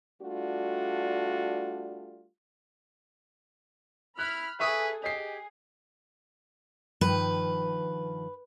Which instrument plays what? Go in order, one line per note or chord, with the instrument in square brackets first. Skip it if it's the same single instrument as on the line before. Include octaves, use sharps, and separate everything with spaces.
[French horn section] G3 A3 D4 F4 F#4
[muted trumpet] E4 [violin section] B5 F6 [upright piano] F#6
[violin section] G#4 A4 [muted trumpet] B4 [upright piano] E5 C#6 D#6
[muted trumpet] G4 [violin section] G#4 [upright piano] D#5 C7
[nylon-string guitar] G2 D#3 F3 [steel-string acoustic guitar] B4